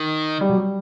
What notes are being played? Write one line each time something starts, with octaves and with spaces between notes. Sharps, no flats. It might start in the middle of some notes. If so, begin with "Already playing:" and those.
Already playing: D#3
G3
F#3
G3